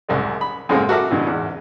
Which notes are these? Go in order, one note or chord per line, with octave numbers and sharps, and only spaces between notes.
C2 F#2 G#3
B5
F#2 A2 G#3 A#3 C4
F#4 A4 A#4 E5 D6
G2 B2 E3
E2 G#2